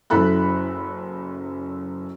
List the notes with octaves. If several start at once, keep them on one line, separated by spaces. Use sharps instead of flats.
F#1 F#2 E4 A4 B5 F#6